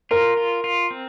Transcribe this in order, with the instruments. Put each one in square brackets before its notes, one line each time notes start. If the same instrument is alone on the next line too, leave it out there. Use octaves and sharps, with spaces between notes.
[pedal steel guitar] F4 [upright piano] A#4
[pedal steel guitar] F4
F4
C4